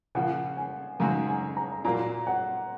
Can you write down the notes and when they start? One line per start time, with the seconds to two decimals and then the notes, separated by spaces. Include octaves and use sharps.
0.15 C#3 F3 A#3 F#5
0.57 G#5
1.00 F#2 C#3 G#3 D#4 F#4 A#5
1.27 G#5
1.57 A#5
1.84 A#2 F#3 A#3 F4 A#5
2.27 F#5